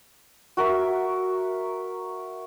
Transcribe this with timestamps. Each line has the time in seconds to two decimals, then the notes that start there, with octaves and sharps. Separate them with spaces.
0.57 F#4 A#4 E5